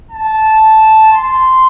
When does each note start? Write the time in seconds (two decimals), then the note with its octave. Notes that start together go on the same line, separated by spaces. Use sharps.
0.11 A5
1.12 C6